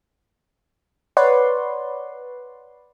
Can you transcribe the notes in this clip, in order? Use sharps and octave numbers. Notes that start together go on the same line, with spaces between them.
B4 C#5 D5 F#5 C6